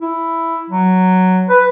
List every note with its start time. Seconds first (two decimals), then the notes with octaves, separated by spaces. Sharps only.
0.01 E4
0.70 F#3
1.49 B4